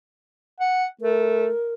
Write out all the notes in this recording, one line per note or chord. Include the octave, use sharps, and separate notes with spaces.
F#5
A3 A#4